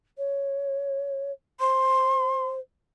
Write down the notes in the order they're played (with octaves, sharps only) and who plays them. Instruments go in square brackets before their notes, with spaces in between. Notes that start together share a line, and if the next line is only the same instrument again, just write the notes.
[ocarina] C#5
[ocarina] C5 [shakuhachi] C6